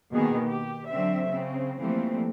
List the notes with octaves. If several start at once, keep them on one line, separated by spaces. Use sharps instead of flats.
B2 D#3 A#3 B3 G#4
G4
D3 F#3 C4 E5
C#3 C4
E3 F3 G3 A3 A#3 C4